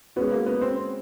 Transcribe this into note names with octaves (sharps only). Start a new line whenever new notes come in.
G#3 B3 C#4 F#4
A#3
B3
C4